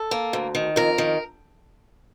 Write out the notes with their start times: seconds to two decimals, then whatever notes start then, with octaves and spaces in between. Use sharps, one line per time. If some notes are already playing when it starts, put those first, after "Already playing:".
Already playing: A4
0.11 A#3
0.33 D2
0.55 D#3
0.76 F2 A#4
0.98 D#3